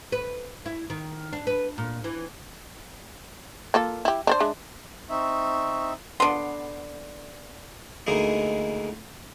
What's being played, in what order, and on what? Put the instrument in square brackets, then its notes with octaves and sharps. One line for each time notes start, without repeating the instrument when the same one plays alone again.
[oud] B4
E4
D#3
D4
B4
A#2
E3
[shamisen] A#3 F4 A4
E4 G4
D4 A4 C5
G#3 D4 E5
[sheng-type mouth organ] C4 D#4 E5 [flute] C#6
[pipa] D3 B3 [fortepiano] C6
[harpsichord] D2 G#3 A#3 D#4 E4